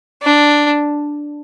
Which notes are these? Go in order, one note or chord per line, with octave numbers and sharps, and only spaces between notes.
D4